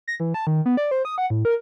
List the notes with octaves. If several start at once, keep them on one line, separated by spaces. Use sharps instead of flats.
A#6
E3
A5
D#3
B3
D5
C5
D#6
F#5
A2
A#4